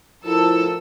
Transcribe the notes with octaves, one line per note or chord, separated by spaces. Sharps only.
D2 A2 F3 E4 A4 A#4 E6